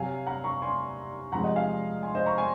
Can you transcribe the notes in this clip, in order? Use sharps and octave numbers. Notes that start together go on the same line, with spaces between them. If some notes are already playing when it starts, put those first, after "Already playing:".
Already playing: C3 F#3 F5 G#5
F#5 A#5
A#5 C#6
G#5 C6
C3 F3 G#3 F#5 A#5
D#5 F#5
F5 G#5
G#5 C6
C5 D#5
A#5 C#6
G#5 C6